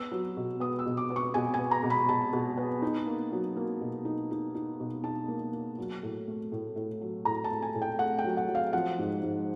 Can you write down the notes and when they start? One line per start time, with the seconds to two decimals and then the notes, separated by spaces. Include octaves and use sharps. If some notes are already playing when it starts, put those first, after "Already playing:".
Already playing: B3 E6
0.12 F#3
0.37 B2
0.60 B3 D#6
0.79 E6
0.86 B2
0.97 D6
1.10 B3
1.16 C#6
1.34 B2 G#5
1.54 G#5
1.59 B3
1.71 A#5
1.83 B2
1.90 B5
2.09 B2 A5
2.33 B2
2.57 B3
2.82 D#4
3.07 A#3
3.32 F#3
3.57 A#3
3.81 B2
4.05 D#4
4.31 D#4
4.55 D#4
4.80 B2
5.04 D#4 A5
5.28 A#3
5.53 A#3
5.78 F#3
6.03 A2
6.28 A3
6.52 A2
6.76 A2
7.01 F#3
7.25 A2 A#5
7.44 A5
7.51 A2
7.62 G#5
7.75 A2
7.82 G5
7.99 A3 F#5
8.19 G5
8.24 F#3
8.37 F#5
8.48 F#3
8.55 F5
8.73 F3 F#5
8.99 G#2
9.23 G#2